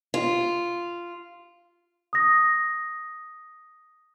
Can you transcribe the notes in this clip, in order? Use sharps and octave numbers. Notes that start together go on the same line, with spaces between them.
F4
D#6 A#6